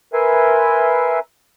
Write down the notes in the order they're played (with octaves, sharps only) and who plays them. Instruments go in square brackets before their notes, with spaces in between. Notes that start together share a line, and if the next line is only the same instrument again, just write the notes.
[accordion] A#4 B4 E5 G#5 C6